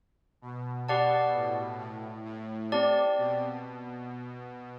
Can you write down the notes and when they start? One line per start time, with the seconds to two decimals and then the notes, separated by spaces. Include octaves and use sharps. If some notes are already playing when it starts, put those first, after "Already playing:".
0.42 B2
0.88 B2 G4 D5 F#5 A5
1.34 A2
1.80 A2
2.25 A2
2.72 C4 G4 D5 A5
3.18 B2